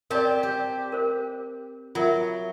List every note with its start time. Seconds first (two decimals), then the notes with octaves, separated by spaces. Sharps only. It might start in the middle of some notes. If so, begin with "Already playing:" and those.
0.10 C4 G4 A#4 C#5 D5 A5
0.43 G4
0.92 A#4 C5
1.95 F#3 F4 A#4 E5